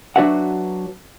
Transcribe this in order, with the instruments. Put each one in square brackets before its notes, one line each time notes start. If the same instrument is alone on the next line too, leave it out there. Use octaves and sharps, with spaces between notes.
[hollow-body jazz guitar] F#3 D4 F#4 B4 E5 F#5